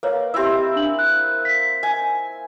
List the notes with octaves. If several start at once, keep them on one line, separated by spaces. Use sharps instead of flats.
A#3 B4 C#5 F5
C4 E4 G4 E6
D4 F#7
F#6
B6
G#5